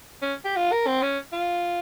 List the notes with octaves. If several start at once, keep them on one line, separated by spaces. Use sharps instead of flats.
C#4
G4
F4
A#4
C4
C#4
F4